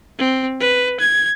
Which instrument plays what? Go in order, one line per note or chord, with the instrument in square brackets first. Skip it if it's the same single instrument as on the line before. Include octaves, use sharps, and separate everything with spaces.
[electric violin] C4
B4
G#6